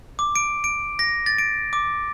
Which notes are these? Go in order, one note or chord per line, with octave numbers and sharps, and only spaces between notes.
D6
D7
D7
A#6
A6
D7
D6